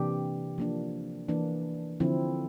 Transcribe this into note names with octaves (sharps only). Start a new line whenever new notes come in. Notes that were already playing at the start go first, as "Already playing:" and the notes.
Already playing: C3 E3 A#3 D4 G4
F3 A#3 D4
E3 A#3 D4
D3 F3 C4 E4